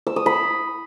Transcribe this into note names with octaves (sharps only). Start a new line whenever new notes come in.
E6
D#6
B5